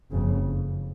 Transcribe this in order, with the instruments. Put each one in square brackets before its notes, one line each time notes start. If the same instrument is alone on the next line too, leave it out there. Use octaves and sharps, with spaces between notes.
[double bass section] F#1 F2 C#3